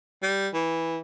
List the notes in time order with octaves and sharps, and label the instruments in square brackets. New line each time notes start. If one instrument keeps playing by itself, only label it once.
[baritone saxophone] G3
E3